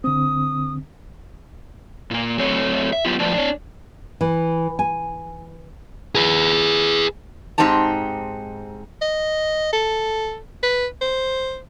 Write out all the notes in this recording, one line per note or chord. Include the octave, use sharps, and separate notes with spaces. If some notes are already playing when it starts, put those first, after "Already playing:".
D3 C4 D#6
A#2 A#3
F#3 A3 C4 C#5
E5
F#3 B3 F4 G4
A2 F3 F#3 B3 D5 A5
D4 C#5
E3
G#5
G#4 B4
G#2 C4 D#4 G4 A5
D#5
A4
B4
C5